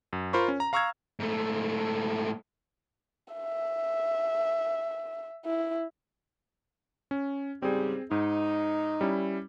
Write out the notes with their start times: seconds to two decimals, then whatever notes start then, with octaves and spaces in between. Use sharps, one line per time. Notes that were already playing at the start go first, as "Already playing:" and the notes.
0.13 F#2
0.33 F4 A#4 C5 B5 C#6
0.48 C#4
0.60 A#5
0.73 F5 A#5 C#6 E6 F6 G#6
1.20 G#2 A3
3.34 E5
5.45 E4
7.11 C#4
7.62 G#2 C#3 G3 C4 G#4
8.11 G#2 D#4
9.01 G3 C#4 E4